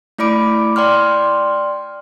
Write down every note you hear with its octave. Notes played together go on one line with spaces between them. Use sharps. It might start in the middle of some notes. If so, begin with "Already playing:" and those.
A3 E4 D5 B5 D6 D7
D5 G5 C6 F6